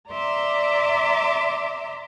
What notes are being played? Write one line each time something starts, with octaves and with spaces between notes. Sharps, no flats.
D5 E5 A#5 C6 D6